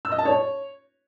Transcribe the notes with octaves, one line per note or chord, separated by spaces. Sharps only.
E6
D#5
A5
C#5